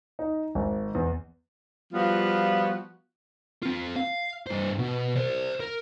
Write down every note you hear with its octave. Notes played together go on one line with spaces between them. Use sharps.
D#4
G#1
E2
F3 G3 B3 F4 F#4
C4 F4
F5
G2 C5
B2
C5 D5
A#4